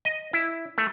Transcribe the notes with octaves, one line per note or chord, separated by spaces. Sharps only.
D#5
E4
A3